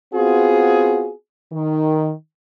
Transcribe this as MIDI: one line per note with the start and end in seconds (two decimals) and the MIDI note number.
0.14 1.11 59
0.14 1.11 60
0.14 1.11 65
0.14 1.11 66
0.14 1.11 68
1.53 2.12 51